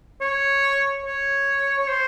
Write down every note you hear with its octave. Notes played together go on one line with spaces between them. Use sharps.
C#5
C#5
C#5
C5